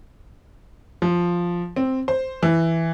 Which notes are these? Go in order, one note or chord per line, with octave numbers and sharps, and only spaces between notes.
F3
C4
C5
E3